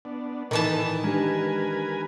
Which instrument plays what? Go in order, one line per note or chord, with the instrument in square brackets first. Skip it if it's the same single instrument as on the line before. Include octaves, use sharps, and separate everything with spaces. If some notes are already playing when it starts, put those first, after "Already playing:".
[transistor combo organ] B3 D4
[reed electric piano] A2 [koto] D#3 E3 A5 [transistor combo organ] D#4 A4 B4
[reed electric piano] G#3 D4 G4 [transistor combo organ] A#4 B4 G#5